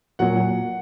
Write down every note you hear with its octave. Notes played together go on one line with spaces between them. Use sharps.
A#2 F#3 F#5